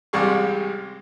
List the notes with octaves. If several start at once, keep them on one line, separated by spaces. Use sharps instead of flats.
A1 C3 G3 G#3 F5 C#6